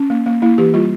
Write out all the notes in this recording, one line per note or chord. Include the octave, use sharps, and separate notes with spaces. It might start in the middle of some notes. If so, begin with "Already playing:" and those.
Already playing: C#4
A#3
A#3
A#3 E4
E3 G4
G3 F4